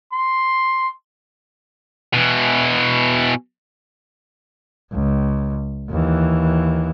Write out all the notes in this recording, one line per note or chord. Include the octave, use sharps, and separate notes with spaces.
C6
B2 E3
C#2
D#2 E3